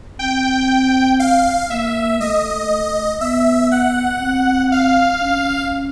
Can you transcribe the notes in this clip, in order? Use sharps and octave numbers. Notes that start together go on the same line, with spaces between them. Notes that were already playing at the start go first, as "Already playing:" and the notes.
C4 G5
F5
A#3 E5
A3 D#5
B3 E5
F#5
C4
F5
C#4